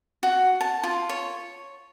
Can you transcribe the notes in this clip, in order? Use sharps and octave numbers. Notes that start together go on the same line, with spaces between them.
F#4
A5
F4
C#5